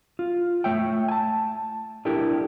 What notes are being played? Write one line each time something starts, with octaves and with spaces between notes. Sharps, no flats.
F4
A3 C#5 E5 G5
G#5 A5
D4 E4 G4 A4 A#4